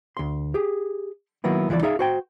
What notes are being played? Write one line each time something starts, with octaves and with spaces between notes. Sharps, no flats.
D2 C6
G4 G#4
D#3 F#3 A#3 B3 E4
C#2 E3 F3 E4 D5
D#4 G#4 E5 F5
F#4 C5 G5